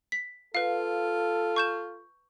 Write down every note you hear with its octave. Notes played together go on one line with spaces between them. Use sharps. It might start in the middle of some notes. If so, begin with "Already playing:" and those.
B6
F4 A4 B4 F5
C#6 G6 E7